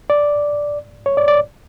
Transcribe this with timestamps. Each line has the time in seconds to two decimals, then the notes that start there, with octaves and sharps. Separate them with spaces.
0.10 D5
1.06 C#5
1.17 D5
1.28 D5